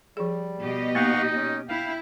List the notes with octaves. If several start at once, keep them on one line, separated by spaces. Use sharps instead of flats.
F3 G3 G#4
B2 G4 D#5
A#3 B3 D#4 F5 F#5 C#6
C#4
E4 F5 G5